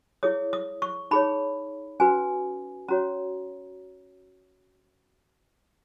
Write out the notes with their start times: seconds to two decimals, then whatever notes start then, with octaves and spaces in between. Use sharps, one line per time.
0.23 E4 G#4 C#5 D#6
0.53 D#6
0.82 C#6
1.11 D#4 G#4 C#5 B5
2.00 C#4 F#4 B4 G#5
2.88 C#4 F#4 C#5 A#5